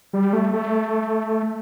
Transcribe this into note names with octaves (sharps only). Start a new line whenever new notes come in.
G3
A3
A3